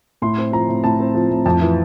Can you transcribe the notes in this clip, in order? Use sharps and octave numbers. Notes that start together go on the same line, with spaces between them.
A2 C6
C4
F3 A#5
A2
A2 A5
C4
F3
A2
F2 A5
E3